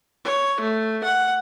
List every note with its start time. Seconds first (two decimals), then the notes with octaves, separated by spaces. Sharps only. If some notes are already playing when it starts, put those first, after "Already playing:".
0.24 C#5
0.60 A3
1.04 F#5